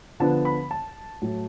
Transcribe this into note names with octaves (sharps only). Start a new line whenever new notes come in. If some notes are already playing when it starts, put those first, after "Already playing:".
D3 F3 B3 D4 A5
B5
A5
A2 F#3 A3